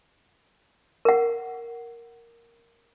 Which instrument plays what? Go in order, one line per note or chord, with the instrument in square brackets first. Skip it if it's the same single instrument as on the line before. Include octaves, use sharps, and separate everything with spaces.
[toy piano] A#4 F#5